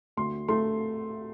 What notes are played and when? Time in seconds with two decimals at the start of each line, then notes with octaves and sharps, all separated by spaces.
0.17 D2 C6
0.48 A3 C6